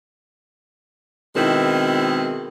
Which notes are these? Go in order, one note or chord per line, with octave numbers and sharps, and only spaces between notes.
B2 D#3 G#3 C4 E4